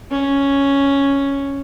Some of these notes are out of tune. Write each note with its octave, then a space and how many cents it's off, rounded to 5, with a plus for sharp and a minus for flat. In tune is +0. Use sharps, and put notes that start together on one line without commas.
C#4 +0